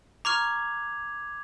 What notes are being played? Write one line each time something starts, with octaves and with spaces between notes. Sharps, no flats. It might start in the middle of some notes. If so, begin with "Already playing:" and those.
A#5 C#6 D6 F6 G#6 F7